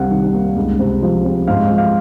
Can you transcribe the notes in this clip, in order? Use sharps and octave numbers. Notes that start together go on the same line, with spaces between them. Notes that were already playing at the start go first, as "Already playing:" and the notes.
Already playing: C2 C3 F5 F#5
D#3
A#3
C#2
C3
F3
C4
G#2 F5
F3
F5